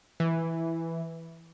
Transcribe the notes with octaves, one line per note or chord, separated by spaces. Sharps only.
E3